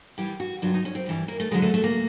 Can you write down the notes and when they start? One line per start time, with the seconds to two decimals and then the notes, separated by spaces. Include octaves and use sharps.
0.18 A2 E3 G3 G4
0.40 F#4
0.62 G2 D3 F#3 F4
0.74 D#4
0.85 C#4
0.95 C4
1.06 G2 E3 G3
1.28 A#3
1.40 A3
1.51 F2 D3 F#3 G#3
1.62 A3
1.74 A3
1.84 A#3